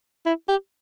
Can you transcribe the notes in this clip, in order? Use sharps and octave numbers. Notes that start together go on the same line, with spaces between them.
E4
G4